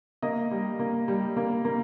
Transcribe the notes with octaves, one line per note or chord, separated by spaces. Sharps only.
A#3 D#5
G3
A#3
G3
A#3
A#3